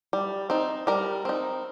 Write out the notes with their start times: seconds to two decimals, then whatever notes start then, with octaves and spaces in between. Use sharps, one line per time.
0.13 G3
0.50 C4 D#4
0.87 G3 A#4
1.25 C4 D#4